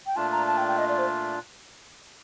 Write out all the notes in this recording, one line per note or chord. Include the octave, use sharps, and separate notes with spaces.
G5
A#2 A3 D4 F4 A5
A#5
A5
G5
G5
D#5
D5
C5